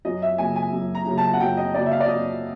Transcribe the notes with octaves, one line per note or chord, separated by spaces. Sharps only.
F#2 D#5
E5
C#3 F#3 A#3 G#5
G#5
F#2
A#5
C#3 F#3 A#3
A5
F#5
F#2 G5
D#5
C#3 F#3 A#3 D5
E5
F5
D5
F#2 D#5